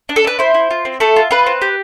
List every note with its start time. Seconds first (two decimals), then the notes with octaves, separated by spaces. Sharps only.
0.09 D4
0.16 A4
0.24 D4 B4
0.39 E4 C5
0.54 E4
0.71 F4
0.85 C4
1.00 A3 A4
1.16 F4
1.31 F4 B4
1.46 C4
1.62 G4